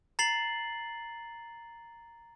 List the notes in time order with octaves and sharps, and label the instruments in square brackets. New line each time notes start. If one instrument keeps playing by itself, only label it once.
[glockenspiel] A#5 A6 C7 F#7